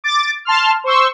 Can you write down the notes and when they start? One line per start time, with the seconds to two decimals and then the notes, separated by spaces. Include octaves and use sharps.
0.04 D6 A6
0.45 A5 C6 F6
0.84 C5 C6 C#6 E6